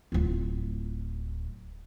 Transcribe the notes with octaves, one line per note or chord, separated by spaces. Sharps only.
D1 F4